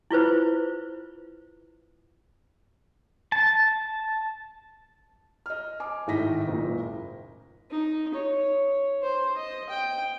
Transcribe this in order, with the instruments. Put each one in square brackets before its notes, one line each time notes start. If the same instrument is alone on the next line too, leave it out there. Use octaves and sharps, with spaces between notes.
[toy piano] E4 F4 B4 C5
[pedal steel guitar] A5
[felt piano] D#5 F6
G#5 D6
G#1 A2 D#4 D#5 A#6 B6
F#1 C#2 A#2
[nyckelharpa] D#4
C#5
C5
D#5
G5